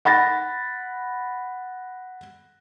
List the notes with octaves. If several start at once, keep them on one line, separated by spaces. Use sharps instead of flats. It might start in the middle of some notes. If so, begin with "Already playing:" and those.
F#5 B5 A6 A#6